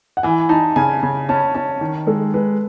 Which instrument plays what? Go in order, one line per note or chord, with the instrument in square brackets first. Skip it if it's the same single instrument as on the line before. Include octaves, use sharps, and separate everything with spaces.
[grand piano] F#5
[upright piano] E3 [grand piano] G#5
[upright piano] D#4 [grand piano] A5
[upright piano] C#3 [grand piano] G#5
[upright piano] C#3
[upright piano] C#4 [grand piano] A5
[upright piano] C#4 [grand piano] A5
[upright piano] D#3
[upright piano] G#3 [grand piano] A4
[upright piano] G#3 [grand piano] B4